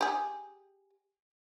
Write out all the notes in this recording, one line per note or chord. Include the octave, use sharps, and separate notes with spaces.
G4 G#4